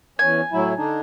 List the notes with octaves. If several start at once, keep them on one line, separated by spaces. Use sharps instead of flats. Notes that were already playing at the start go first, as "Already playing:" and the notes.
E2 C#4 G#5
A2 F#3 E4
D3 D4 D#4